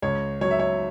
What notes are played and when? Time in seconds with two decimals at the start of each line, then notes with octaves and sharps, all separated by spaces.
0.02 C#2 C#5
0.41 F#3 C#5
0.51 E5
0.59 C#5